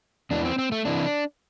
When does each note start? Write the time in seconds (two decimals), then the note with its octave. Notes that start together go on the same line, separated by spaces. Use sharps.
0.31 E2 E3 D4
0.45 C4
0.58 C4
0.72 A3
0.85 C3 E3 D4